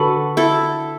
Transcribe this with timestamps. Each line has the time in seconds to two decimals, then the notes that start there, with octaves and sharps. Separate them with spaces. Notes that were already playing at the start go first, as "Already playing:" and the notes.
Already playing: D3 F#4 A4 B4
0.37 E4 A4